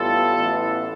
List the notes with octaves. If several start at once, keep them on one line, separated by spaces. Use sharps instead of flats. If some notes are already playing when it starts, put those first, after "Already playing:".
Already playing: A1 A2 G3 B3 F4 A4
A1 A2 E3 B3